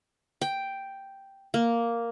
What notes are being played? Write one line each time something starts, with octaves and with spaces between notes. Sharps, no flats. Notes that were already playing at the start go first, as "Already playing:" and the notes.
G5
A#3